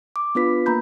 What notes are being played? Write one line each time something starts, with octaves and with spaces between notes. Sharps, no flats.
D6
B3 D4 F4 B4 B6
A#3 A#5 B5 G6